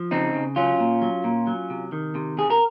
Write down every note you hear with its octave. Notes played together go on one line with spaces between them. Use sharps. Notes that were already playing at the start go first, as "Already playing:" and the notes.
Already playing: F3
C#3 C4 D#4
C#3
F#3 C#4 F4
A#2
F#3
A#2
F#3
C3
D#3
C3
C3 G#4
A#4